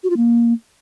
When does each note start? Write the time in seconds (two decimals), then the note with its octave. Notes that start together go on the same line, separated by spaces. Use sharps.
0.04 F#4
0.10 F4
0.17 A#3